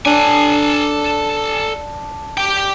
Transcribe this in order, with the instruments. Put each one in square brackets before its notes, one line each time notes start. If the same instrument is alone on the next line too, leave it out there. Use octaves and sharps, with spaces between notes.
[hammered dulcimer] D4 [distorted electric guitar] A4 G#5
[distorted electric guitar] G4 G5